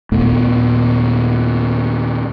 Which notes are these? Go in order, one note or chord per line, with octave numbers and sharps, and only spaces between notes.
D#2 A#2 A3 B3